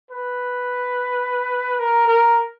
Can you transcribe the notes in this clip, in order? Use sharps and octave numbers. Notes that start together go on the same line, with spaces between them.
B4
A#4
A#4